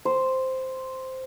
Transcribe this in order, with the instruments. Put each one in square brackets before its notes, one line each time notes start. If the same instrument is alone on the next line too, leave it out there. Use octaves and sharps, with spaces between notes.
[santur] C5